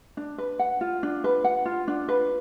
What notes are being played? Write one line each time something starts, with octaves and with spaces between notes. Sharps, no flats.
D4
B4
F#5
F4
D4
B4
F#5
F4
D4
B4